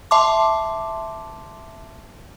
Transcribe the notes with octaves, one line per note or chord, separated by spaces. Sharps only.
E5 A5 C6 D6